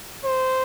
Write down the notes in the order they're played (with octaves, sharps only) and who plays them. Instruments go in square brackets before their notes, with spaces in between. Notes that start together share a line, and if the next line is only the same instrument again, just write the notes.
[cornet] C5